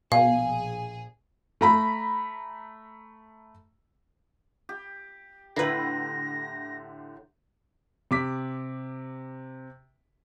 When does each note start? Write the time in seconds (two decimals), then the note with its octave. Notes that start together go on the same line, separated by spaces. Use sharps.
0.12 A#1 B2 G#4 F5
1.61 A3 A#5 B5
4.69 G4
5.56 A2 D3 E4 B4 A#5 C6 A#6
8.11 C3 D6 B6